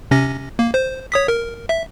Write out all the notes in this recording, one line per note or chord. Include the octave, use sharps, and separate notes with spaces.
C3 C#4 A#6
A#3
C5
C#5 D#6 B6
A#4
E5